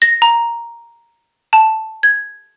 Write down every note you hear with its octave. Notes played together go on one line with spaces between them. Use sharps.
A#6
A#5
A5
G#6